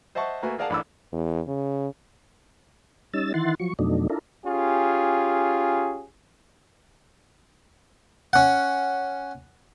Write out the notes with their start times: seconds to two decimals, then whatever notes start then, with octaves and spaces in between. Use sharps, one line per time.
0.15 C5 D#5 E5 F#5 A5 C#6
0.42 A3 A#3 F#4 B4 E5 G#5
0.59 G#4 A#4 D5 F5 F#5 A5
0.70 A1 D4 B5 D6 E6
1.13 E2
1.47 C#3
3.14 G3 C#4 D#4 E6 A6
3.34 D#3 E3 E4 F#5 C6 A6
3.60 F3 F#3 C#6
3.79 F2 B2 F#3 A3 D4 D#4
4.10 D4 E4 F4 A4 A#4
4.46 C#4 F4 G4 G#4
8.33 C#4 F#5